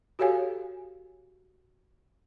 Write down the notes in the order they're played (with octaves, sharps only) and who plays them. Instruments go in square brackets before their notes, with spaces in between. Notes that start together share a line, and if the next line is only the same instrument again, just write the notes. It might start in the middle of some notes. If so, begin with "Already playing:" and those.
[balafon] F#4 G4 A4 C#5 F5 G#5